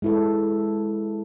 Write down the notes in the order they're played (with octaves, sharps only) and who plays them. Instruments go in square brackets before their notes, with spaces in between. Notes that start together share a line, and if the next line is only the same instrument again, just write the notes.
[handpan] G#3 E4 A4